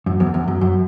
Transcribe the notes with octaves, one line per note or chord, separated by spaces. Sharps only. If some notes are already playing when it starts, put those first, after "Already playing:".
F#2
E2
E2
F#2
F#2